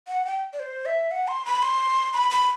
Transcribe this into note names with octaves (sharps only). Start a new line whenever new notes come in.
F#5
G5
D5
C5
E5
F#5
C6
B5
C6
B5
B5